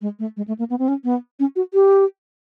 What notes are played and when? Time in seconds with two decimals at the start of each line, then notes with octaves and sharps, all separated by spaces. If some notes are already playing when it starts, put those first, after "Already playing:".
0.02 G#3
0.19 A3
0.37 G#3
0.48 A3
0.59 A#3
0.70 B3
0.79 C4
0.88 C#4
1.04 B3
1.40 C#4
1.56 F#4
1.74 G4